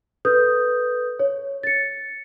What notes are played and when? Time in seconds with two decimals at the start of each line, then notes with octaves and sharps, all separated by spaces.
0.25 A4 B4 D#6 G6
1.19 C#5
1.63 A6 C#7